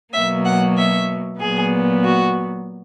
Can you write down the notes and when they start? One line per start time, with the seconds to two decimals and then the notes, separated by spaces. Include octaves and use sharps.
0.13 B2 F#3 A#3 E5
0.45 F#5
0.77 E5
1.40 A#2 F#3 B3 G#4
2.04 F#4